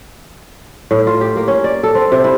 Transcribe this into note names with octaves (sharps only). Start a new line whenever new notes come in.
A2
F4
G4
A#3
C#4
D5
A4
C4
C3
E4